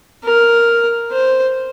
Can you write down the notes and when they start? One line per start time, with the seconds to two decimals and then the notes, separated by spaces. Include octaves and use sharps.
0.24 A#4
1.12 C5